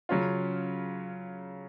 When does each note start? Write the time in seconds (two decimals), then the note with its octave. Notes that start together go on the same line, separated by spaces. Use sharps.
0.09 C#3 F#3 C#4 F4